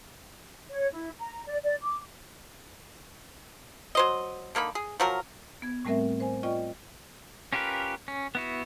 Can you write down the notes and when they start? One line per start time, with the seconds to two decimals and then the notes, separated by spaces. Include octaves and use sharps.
0.69 C#5
0.93 E4
1.19 A#5
1.45 D5
1.62 D5
1.83 D6
3.95 F#3 C5 D#5
4.55 D3 A#3 D#4 B5
4.75 G#4
5.00 F3 F#3 A#4
5.62 B3 G#6
5.85 A2 G3 A3 C4 A#4 E5
6.20 C5 G#5
6.43 F4 D5 D#5 G5 C#6
7.53 C#4 F4 G4 A#4 B4
8.08 C#4
8.35 B3 E4 F#4